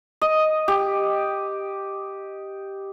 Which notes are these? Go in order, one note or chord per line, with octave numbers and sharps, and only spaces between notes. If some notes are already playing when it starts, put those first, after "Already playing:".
D#5
G4